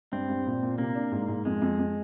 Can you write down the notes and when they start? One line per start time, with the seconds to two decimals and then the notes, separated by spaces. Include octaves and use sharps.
0.12 G2 C4
0.29 G2
0.46 A#2
0.63 A#2
0.78 C3 A#3
0.95 D4
1.12 G#2
1.28 G#2
1.45 F2 G#3
1.62 F2
1.79 F2